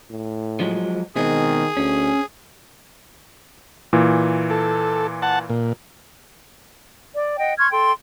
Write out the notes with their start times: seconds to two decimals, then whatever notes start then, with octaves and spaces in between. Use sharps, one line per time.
0.10 A2
0.60 F3 F#3 G#3
1.16 B2 D#3 G#3 C4 G#4
1.77 D2 C#4
3.93 A#2 E3
4.50 A4
5.22 F#5 A5
5.50 A#2
7.14 D5
7.38 D#5 F#5 G5
7.58 C6 C#6 F6 G#6
7.71 A4 G5 C6